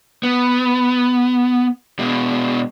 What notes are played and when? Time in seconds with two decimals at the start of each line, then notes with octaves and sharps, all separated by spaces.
0.23 B3
1.99 B2 G#3